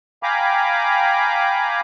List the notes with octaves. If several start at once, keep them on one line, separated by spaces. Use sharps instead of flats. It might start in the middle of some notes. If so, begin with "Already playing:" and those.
F5 G5 G#5 A#5 B5 D6